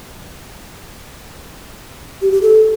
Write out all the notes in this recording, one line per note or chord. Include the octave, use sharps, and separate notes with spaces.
G4
G4
A4